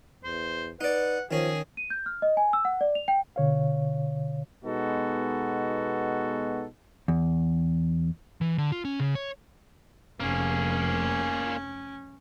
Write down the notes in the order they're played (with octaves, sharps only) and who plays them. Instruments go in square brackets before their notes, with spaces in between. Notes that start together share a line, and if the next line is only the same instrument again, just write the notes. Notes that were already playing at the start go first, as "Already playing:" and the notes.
[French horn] E2 [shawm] C5
[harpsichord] D#4 D5 [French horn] B4 [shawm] F#5
[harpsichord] D#3 C#4 [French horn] F3 [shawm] G#4
[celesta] D#7
G6
F6
D#5
G#5
E6
F#5
D5
F7
G5
[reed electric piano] B2 D3 C#5 F5
[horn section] B2 G#3 B3 D#4 F#4 A4
[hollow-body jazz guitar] E2
[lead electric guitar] E3
D3
F4
C#4
C#3
C#5
[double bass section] F1 [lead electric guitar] A#3 G#4 [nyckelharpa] C#4